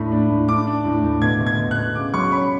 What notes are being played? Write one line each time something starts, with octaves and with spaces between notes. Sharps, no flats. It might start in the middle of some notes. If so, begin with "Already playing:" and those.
Already playing: A2 D4 B5
D4
A2
D4 D6
D4
A2
A2
B2 G#6
B2
G#6
B2
F#6
B2
C#3 D6
F#3 C#6
C#4 B5